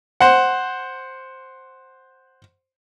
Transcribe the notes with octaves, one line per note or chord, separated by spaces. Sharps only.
C5 F#5